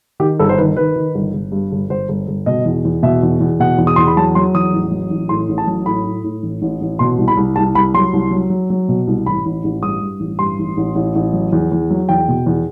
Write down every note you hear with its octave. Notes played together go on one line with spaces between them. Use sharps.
D#3 G4
G1 A4
C5
D#3 B4
D#3 B4
D#3
G1
G1
G2
G1
G1 C5
G1
G1
B2 D#5
E2
E2
B2 E5
E2
E2
B2 F#5
E2
D#6
E2 C6
B5
F#3 A5
F#3 C6
E2 D#6
A1
F#3
A1
A2 C6
A1
A5
F#3
A2 B5
A2
A2
A1
A1
A1
B2 C6
C2
B5
C2
C2 A5
C2 B5
F#3 C6
C2
F#3
F#3
F#3
B2
C2
A1 B5
A1
A1
G2 D#6
G2
A1
G2 C6
A1
A1
A1
A1
F#3
E2
E2
F#3
E2 G5
B2
E2